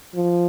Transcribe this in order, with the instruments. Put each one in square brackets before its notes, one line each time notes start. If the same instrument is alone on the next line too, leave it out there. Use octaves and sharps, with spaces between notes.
[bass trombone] F3